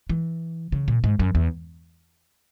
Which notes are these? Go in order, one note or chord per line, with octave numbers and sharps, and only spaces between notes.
E3
C#3
A#2
G#2
F#2
E2